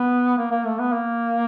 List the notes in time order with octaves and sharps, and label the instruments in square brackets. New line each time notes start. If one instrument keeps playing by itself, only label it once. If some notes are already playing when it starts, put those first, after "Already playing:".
Already playing: [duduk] B3
A#3
A#3
A3
B3
A#3